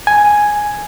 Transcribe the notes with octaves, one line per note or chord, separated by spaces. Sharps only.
G#5